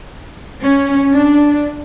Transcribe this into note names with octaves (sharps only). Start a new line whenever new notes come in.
C#4
D4